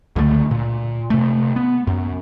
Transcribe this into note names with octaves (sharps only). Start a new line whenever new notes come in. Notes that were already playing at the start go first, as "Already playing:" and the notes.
C#2 D3 E3 A3
A#2
C3 A3
B3
F#2